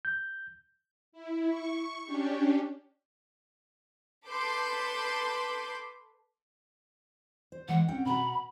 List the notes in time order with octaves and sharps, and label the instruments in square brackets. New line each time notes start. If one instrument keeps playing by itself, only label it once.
[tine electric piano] G6
[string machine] E4
C#6
C#4 D4 G4
[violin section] A4 B4 B5 C6 D6 G6
[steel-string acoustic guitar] C5
[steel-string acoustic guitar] E3 G#3 [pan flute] F#5
[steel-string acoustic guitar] C4 C#4 G5
[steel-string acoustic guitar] B2 F#5 A#5 [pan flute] B5